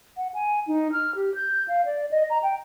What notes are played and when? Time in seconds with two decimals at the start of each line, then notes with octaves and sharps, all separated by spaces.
0.17 F#5
0.34 G#5
0.67 D#4
0.92 F6
1.15 G4
1.35 G6
1.68 F5
1.85 D5
2.11 D#5
2.30 A#5
2.43 G5